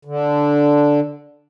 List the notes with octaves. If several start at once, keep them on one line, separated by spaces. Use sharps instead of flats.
D3